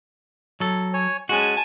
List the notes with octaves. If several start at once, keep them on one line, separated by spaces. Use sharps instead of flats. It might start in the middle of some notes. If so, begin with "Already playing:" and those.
F#3 A4
C#5 G#5
G#3 C#4 F#4 G#5 A5